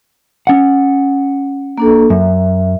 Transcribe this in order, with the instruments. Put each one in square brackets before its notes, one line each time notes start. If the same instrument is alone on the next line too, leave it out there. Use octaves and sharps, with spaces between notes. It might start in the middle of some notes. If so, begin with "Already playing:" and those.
[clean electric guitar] C#4 F#5
[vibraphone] A#3 D4 A4
[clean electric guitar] F#2 [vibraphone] E5